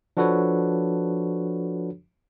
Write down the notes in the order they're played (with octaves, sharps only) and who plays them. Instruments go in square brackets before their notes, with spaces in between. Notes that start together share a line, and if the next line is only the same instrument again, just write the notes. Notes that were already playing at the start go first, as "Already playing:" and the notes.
[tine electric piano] F3 D4 F#4 A4 B4 C#5